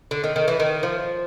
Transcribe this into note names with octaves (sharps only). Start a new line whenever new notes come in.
D3
D#3
D#3
E3
D#3
F3